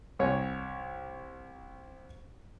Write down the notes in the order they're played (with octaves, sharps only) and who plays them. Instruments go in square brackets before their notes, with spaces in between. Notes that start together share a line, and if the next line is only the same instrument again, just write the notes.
[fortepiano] C2 C#5 G#5